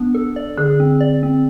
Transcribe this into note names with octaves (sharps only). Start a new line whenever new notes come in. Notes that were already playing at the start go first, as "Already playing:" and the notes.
Already playing: B3 D4
A4
D5
D3 G#4
C4
D5
C4